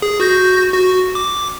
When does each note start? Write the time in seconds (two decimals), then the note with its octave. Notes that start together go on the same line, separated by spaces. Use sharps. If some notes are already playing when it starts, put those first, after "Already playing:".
0.02 G#4
0.20 F#4 G6 A#6
0.73 F#4
1.15 D6